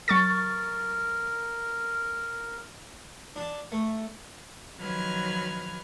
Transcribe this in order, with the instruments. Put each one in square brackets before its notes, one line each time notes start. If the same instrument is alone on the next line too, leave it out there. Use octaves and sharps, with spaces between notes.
[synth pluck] F#3 C#6 A6 [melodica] A#4
[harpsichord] D4 A5
A3
[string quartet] D#3 F3 F#3 B4 F6 G#6